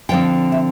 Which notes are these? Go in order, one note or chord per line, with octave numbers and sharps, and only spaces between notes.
D3 F3 C4 G5
E5